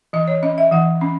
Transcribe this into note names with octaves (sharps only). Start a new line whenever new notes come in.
E3 D#5
C#5
C#4 D#5
E5
E3 F#5
C#4